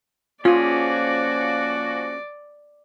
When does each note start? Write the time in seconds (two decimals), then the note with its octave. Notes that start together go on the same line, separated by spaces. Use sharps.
0.45 F3 A#3 C#4 F4 F#4 G#4 D5